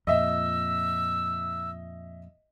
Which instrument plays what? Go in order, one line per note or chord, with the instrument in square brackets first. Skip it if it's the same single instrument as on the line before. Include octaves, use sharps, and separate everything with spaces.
[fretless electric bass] F2 A#2 [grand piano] D#5 E5 [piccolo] E6